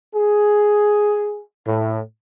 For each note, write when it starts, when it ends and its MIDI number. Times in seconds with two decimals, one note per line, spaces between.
0.15 1.42 68
1.66 1.99 45